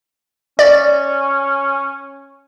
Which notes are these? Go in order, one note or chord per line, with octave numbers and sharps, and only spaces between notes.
C#4 D5